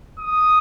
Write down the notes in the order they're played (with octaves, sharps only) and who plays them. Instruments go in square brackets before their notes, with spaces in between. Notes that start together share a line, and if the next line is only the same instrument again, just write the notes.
[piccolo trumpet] D#6